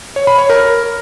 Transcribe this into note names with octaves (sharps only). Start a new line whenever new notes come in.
C#5
B5
C#5
A#4